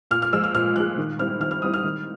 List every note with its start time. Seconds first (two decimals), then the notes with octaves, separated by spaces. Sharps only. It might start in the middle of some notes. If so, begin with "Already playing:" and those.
0.11 A#2 F6
0.22 F6
0.33 F3 G#3 E6
0.44 F6
0.54 A#2 F6
0.76 F3 G#3 F#6
0.98 D#3
1.19 G3 C4 E4 F6
1.40 D#3 F6
1.51 F6
1.62 G3 C4 E4 D#6
1.74 F6
1.84 D#3